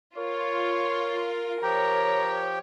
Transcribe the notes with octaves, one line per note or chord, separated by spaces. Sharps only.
F4 A#4 C#5
F3 G4 C#5 G5 A#5